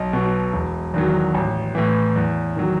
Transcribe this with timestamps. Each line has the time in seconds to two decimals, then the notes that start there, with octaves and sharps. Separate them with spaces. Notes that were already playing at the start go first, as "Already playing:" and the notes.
Already playing: B1 D#5
0.13 B2 F#3
0.53 E1
0.94 E2 D#3 F#3
1.35 A1
1.75 A2 E3
2.16 E2
2.56 D#3 F#3